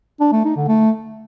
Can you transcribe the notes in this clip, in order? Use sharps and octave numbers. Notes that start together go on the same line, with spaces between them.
D4
A3
D#4
D3
A3